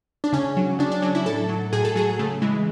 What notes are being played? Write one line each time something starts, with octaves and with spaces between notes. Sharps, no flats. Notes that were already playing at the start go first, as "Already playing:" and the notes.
D4
C#3 C#4
F#3
C#3 D4
D4
F#3 D4
E4
A2 A4
F#3
A2 G#4
A4
F#3 G#4
C#3 A3
E3 G#3